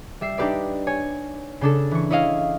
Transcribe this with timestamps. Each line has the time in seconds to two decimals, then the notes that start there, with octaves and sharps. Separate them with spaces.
0.21 G3 E5 C7
0.38 D4 D#4 G4 B4 D5
0.87 C#5 G#5
1.61 C#3 D4 A4
1.91 E3 C#6
2.11 E4 C#5 D#5 F5